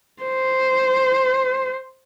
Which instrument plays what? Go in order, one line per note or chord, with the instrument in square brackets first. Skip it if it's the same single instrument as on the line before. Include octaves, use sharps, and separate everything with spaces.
[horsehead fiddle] C5